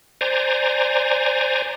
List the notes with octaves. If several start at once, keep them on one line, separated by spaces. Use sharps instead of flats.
C5 D5 G#5 A#5